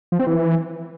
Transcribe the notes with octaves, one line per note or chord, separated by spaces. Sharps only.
F3
C4
E3